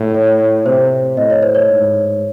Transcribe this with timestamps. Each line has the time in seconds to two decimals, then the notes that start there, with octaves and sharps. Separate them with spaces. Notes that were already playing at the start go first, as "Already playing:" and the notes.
Already playing: A2
0.15 C#5
0.66 C3 C5
1.17 A2 D#5
1.30 C#5
1.42 C5
1.55 C#5
1.70 G#2